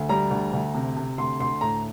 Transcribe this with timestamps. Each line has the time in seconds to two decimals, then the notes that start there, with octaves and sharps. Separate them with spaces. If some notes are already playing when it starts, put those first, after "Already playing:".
Already playing: D2
0.09 G3 A#5
0.31 D2
0.53 D2
0.75 C3
0.96 C3
1.18 D2 C6
1.40 D2 C6
1.61 A2 A#5